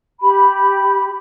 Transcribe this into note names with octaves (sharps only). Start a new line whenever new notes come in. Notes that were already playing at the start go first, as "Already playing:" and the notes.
G4 B5